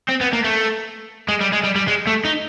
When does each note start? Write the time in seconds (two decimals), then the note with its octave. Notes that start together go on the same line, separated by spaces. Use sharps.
0.08 C4
0.21 B3
0.33 A#3
0.44 A3
1.29 G#3
1.41 G3
1.53 G#3
1.64 G3
1.76 G3
1.88 G#3
2.07 A3
2.25 D#4